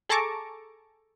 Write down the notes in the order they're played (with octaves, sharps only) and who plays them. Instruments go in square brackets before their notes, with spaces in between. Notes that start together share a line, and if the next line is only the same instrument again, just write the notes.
[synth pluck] G#4 A4 A5 A#5 C#6 D6